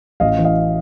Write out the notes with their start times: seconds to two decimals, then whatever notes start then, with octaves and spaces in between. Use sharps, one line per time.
0.20 A1 D#5 F5
0.39 E3
0.44 D#5 F5